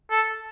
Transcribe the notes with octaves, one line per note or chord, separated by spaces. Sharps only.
A4